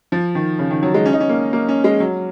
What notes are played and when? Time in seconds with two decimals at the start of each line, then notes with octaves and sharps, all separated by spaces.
0.12 F3
0.35 D#3
0.59 C#3
0.71 D#3
0.83 F#3
0.94 G#3
1.06 C#4
1.13 D#4
1.20 C#4
1.29 A#3
1.53 A#3
1.69 C#4
1.84 G#3
2.00 F#3